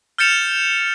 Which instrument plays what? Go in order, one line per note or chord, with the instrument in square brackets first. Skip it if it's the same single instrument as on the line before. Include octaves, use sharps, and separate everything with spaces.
[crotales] F6 G6 A6 C#7 E7 F7